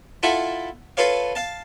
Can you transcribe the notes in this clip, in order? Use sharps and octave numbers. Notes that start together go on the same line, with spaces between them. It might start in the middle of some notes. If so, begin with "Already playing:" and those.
E4 F4 A4 E5 F#5
F4 A4 B4 C#5 F5
F5 A5